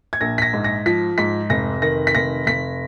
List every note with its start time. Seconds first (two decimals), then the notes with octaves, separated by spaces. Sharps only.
0.13 G#6
0.21 A#1 A#6
0.38 B6
0.42 A#6
0.53 G#2
0.64 A#6
0.86 F3 B6
1.18 G#2 B6
1.50 F1 A#6
1.82 D#3 A#6
2.07 B6
2.15 F1 A#6
2.47 F1 B6